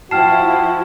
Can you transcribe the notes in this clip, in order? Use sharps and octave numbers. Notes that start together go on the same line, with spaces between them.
F3 E4 F#4 G5 A5 F6 C7